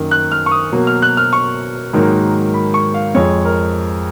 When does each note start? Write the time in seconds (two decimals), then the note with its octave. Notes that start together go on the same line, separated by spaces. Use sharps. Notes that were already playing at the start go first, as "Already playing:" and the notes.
Already playing: F#2 D#3 A#3
0.11 F#6
0.32 F6
0.46 C#6
0.51 D#6
0.72 B2 F#3 A#3
0.87 F6
1.02 F#6
1.17 F6
1.33 C#6
1.93 G#2 D#3 F#3 A#3
2.54 B5
2.74 C#6
2.94 F5
3.14 F2 F3 G#3 C#5
3.45 A#4